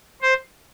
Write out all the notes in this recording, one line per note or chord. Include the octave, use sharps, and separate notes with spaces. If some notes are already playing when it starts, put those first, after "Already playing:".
C5